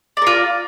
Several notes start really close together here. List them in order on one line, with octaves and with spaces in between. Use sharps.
D5 A#4 F4